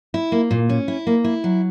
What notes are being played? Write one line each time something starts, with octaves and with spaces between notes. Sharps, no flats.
E4
A#3
A#2
C#4
E4
A#3
E4
F#3